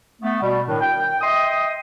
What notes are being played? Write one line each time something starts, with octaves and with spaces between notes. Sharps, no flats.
A3 B3
B2 G3
A2 D#3 D4
G5
D#5 E5 G5 C6 D#6